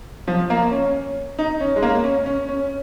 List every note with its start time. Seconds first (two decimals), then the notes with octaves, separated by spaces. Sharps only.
0.27 F3
0.50 A#3
0.71 C#4
1.39 D#4
1.61 C#4
1.76 G#3
1.83 A#3
2.04 C#4
2.26 C#4
2.49 C#4